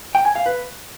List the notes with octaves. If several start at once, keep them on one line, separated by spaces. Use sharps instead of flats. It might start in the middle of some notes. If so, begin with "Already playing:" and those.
G5
G#5
F5
B4